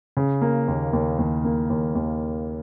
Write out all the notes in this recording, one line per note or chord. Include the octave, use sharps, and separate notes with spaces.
C#3
A#3
D#2
D#2
D#2
A#3
D#2
D#2